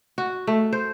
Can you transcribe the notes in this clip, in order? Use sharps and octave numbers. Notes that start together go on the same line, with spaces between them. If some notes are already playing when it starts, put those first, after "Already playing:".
F#4
A3
C5